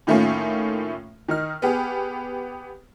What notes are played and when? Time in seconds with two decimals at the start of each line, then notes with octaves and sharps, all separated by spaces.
0.07 A2 D#3 A3 A#3 C#4 F4
1.28 D#3 D#4 F6
1.62 B3 G4 G#4